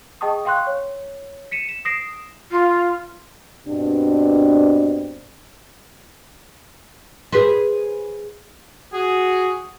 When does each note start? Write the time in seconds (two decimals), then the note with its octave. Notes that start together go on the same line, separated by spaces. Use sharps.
0.21 G#4 D#5 G5 A5 C#6 D#6
0.45 F5 G5 C6 C#6 F#6
0.67 C#5
1.51 B6 C#7 D#7 E7
1.69 E7
1.85 D#6 A#6 C7 D7 E7
2.51 F4
3.67 G2 B2 C4 D4
7.32 G#4 B4 C5
8.93 F#4 G#4